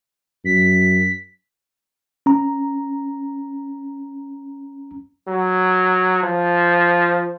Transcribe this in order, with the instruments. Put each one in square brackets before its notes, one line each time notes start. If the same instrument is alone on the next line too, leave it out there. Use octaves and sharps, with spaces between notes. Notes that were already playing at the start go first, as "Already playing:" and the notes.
[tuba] F#2 [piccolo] B6
[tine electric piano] C#4 A#5
[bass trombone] F#3
F3